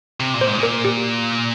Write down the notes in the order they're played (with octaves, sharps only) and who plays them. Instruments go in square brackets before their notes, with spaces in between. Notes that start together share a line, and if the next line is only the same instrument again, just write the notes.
[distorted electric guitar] C3
A#2
[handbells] C5
[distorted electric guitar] G#2
[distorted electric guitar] A#2 [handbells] A#4
[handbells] G4